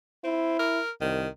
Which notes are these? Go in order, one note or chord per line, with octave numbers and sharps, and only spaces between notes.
C4 E4
A#4
C2 D#3